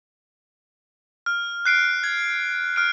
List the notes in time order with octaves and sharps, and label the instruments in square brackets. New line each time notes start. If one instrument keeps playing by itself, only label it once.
[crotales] F6
F#6 C7 D7
G#6
F6 D7